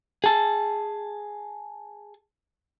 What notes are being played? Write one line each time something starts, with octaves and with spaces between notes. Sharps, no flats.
G#4 A5